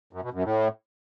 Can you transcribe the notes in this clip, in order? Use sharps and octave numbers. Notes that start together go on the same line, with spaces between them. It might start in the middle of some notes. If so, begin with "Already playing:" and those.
F#2
B2
F#2
A2